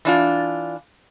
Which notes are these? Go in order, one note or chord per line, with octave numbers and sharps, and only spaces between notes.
E3 D4 F4